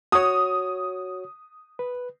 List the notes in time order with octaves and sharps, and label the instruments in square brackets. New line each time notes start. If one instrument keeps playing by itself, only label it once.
[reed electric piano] F#4 C#5 [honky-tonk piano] D#6
[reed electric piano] B4